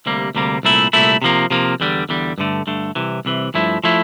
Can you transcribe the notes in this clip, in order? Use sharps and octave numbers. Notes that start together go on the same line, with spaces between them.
D2 C3 G3 A#3
D2 C3 G3 A#3
C2 A#2 A3 E4
C2 A#2 A3 E4
C3 F3 A#3
C3 F3 A#3
E2 D3 G3
E2 D3 G3
G2 D3 A3
G2 D3 A3
C2 C3 E3
C2 C3 E3
G2 F3 A3 E4
F3 A3 E4